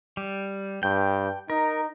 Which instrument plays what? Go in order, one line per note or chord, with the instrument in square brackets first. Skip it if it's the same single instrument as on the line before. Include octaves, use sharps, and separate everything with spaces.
[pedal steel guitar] G3
[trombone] G2 [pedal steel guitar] G5
[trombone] D#4 [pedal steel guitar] A#4